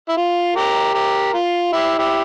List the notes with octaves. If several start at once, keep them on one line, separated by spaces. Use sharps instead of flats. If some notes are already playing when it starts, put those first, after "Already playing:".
E4
F4
G4 A#4
G4 A#4
F4
E4 G4
E4 G4